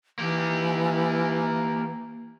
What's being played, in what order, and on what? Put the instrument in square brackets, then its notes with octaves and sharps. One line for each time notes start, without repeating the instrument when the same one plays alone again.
[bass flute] E3 [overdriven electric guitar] A#3 G4